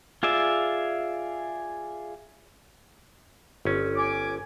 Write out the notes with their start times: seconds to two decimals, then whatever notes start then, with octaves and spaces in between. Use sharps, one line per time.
0.23 F4 G#4 D5 E5
3.65 G1 C#4
3.96 G#5 D6